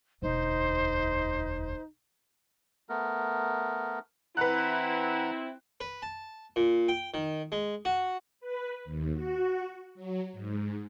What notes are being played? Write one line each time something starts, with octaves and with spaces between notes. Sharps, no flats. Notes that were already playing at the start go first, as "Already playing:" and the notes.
E1 D2 D#4 C5
A3 B3 A#4
E3 C4 E4 B4 F#5 A#5 F#6
B4
A5
A#2
G5
D#3
G#3
F#4
B4
D#2
F#4
F#3
G#2